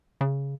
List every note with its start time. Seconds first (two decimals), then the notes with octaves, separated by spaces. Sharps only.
0.21 C#3